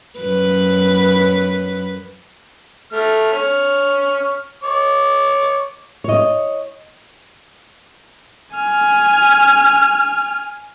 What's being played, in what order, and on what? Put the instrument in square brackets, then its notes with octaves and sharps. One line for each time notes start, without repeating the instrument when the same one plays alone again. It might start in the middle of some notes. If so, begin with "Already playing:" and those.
[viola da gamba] F#2 B4
[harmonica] A3 F6
C#5 F6
C#5 D6
[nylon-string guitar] C#5 D#5
[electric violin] G#5 F6